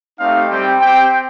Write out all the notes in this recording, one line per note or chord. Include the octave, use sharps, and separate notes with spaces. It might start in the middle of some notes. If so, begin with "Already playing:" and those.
A3 C4 D#4 G4 F5
G3 C4 G4 G5
C4 G4 G5